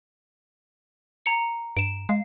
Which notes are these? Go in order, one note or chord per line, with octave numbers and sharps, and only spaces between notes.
A#5 C#7
G2 D7 E7
G#3 F5